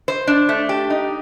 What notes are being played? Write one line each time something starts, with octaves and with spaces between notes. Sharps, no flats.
C5
D4
A3
G4
D#4